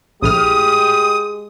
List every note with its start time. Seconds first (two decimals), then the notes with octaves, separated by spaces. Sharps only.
0.23 A#1 A2 G#3 G4 D#6 F6